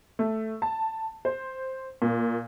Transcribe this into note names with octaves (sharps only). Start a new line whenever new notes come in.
A3
A5
C5
A#2